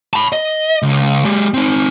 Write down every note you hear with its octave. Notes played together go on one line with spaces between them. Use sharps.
A5 B5
D#5
C#2
G#3 G4
C4 D#4